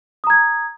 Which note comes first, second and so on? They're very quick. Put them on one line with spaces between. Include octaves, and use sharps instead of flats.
D#6 A#5 G#6